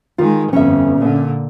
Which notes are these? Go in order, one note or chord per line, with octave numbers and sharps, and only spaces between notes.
D#3 G#3 F4
G1 F2 C#4 E5
A#2 D3